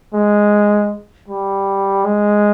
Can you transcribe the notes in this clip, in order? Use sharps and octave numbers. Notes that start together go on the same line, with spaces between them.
G#3
G3
G#3